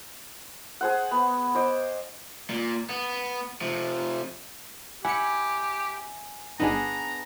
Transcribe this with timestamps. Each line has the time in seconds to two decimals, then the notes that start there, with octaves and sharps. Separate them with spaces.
0.81 G#4 C5 F#5
1.11 B3
1.55 C5 D#5 D6
2.50 A#2
2.90 B3
3.61 C3 F3
5.05 E4 G4 F#5 G#5 C#7
6.60 G1 D3 B3 D4 D#4 G#4 A#5